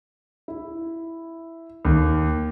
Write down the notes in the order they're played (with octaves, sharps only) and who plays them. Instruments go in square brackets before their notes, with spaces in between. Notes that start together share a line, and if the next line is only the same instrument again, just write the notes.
[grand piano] E4
D#2